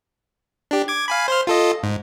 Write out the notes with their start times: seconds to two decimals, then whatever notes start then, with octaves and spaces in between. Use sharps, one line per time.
0.71 D4 G4
0.88 D6 G#6
1.08 F5 G#5 B5
1.28 C5 C6 F6
1.47 F4 A4 D#5
1.83 G#2